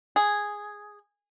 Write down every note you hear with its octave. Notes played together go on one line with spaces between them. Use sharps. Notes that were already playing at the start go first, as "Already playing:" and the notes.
G#4